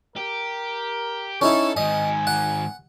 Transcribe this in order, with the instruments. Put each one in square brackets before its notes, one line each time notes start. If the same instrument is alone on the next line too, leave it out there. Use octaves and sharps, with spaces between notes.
[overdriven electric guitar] G4 [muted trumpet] A#4
[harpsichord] C#4 D#4 E4 [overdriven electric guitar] A4 [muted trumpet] C#6
[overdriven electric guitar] G#2 D#3 [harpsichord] D#5 [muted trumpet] G#5
[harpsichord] F#5